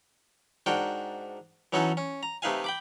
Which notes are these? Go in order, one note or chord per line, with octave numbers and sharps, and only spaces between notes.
G#2 D4 F#4 A#4 G5
E3 F#3 C#4 D#4 F#4 A4
C#4
A#5
C3 A3 D#4 B4 F5 G#5
G5 B5 D6